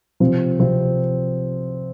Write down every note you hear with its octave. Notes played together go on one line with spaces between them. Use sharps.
C3 F3 C4
C3 F3 C4